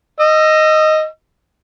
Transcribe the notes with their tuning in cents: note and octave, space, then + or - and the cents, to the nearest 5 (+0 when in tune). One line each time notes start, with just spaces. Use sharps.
D#5 +0 E6 +30